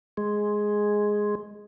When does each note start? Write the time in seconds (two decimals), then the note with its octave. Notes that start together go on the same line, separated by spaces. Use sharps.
0.17 G#3